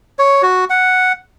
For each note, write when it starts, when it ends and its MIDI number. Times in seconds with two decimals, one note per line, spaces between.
0.19 0.42 73
0.42 0.65 66
0.70 1.12 78